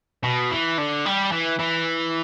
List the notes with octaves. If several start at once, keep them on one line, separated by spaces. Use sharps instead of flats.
B2
E3
D3
G3
E3
E3